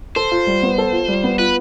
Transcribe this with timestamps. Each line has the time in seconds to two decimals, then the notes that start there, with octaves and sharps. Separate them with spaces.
0.16 A4 C5
0.31 F4
0.47 G3
0.63 B3
0.78 A4
0.92 F4
1.08 G3
1.24 B3
1.39 F4 B4